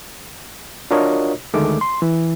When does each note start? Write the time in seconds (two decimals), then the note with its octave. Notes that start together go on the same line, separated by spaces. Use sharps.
0.91 D4 F4 F#4 A#4 C#5 D#5
1.54 D2 D#3 G#3 A3 D6
1.81 C6
2.02 E3